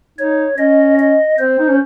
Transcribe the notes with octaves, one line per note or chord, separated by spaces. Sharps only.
D#4 C#5
C#4 D#5
D#5
C4 C5
D#4
C#4